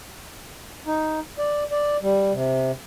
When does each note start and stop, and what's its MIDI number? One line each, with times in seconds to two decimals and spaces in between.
0.87 1.20 63
1.39 1.64 74
1.71 1.97 74
2.02 2.33 55
2.33 2.72 48